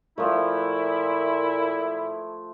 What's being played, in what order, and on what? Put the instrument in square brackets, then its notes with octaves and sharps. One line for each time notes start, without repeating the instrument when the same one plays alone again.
[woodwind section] A#2 E4 [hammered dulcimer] F3 A3